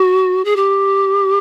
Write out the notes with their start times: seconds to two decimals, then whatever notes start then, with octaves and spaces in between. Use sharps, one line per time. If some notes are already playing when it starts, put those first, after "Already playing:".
Already playing: F#4
0.45 G#4
0.56 G4